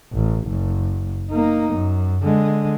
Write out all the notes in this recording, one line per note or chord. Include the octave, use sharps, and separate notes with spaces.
A1
F#1
A#3 D#4
F#2
D3 G#3